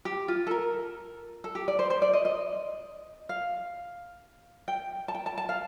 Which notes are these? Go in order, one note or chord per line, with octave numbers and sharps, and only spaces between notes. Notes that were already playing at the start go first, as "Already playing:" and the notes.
G4
F4
A4
A#4
A4
G4
D5
C5
C5
D5
D#5
D#5
F5
G5
A5
G5
A5
A5
F5